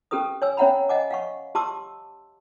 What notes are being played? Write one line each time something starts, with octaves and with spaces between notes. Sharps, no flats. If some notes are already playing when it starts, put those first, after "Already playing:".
C#4 G4 A4 B4 D#6
C#5 G#5 E6
C#4 C#5 E5 F#5 A#5 B5
D#5 F#5 G#5 D6
F5 F#5 C#6
G4 A5 C6 D6 E6